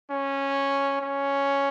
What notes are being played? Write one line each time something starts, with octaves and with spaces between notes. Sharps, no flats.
C#4
C#4